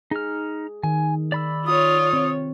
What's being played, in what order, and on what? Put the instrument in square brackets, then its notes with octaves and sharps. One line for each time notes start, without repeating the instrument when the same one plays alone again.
[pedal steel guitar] D#4 F6 [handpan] G#4
[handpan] D#3 [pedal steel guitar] G#5
[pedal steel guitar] D5 B5 E6
[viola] F4 C#5 [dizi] D#6
[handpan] C4